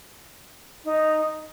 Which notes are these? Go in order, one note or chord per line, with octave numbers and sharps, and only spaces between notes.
D#4